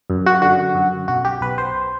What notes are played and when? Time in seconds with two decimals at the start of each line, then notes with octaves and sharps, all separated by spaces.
0.10 F#2
0.26 F#4
0.42 D3 F#4
0.75 F#2
1.08 B1 F#4
1.25 G4
1.41 B1 B4
1.58 C5